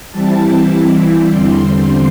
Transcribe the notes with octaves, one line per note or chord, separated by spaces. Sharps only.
E3 G3 C4 E4 A5
E2 D3 G3 C4 C6